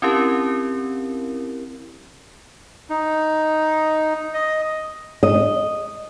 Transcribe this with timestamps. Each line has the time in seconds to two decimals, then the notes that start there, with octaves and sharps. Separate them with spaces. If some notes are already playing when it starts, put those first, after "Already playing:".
0.02 C4 C#4 E4 G4 A#4
2.90 D#4
4.34 D#5
5.23 D#5